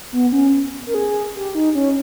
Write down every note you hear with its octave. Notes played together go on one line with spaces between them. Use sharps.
B3
C#4
A#4
G#4
G4
D#4
C#4